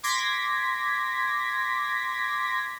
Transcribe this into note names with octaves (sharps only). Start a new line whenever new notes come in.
C6 D6 G#6 A#6 B6